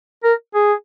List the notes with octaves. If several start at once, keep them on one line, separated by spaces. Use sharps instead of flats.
A#4
G#4